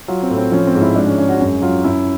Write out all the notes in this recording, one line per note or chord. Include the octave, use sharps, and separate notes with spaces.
F#3 F4
C4
A2
C4
F3 C#4
C4
G#2
E4
G#3 D4
C#4
G#3 C#4
F#4
F#2
F#3 F4
F#2 E4